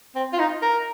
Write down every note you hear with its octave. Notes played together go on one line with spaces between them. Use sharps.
C4
F4
D#4
A#4